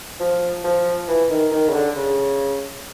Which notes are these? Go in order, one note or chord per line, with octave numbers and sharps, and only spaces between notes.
F3
F3
E3
D#3
D#3
C#3
D3
C#3